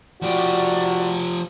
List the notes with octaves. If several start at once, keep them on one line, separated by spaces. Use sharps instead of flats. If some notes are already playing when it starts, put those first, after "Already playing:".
F3 F#4 G4 D5